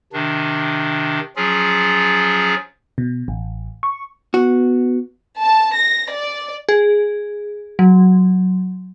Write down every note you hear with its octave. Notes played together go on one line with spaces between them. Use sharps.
C3 D#3 D4
F3 F#3 C#4 F4 G#4
B2
A1
C#6
B3 F#4
A5
A#6
D5
G#4
F#3